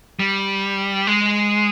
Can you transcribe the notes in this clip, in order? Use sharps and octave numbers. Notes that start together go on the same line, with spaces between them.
G3
G#3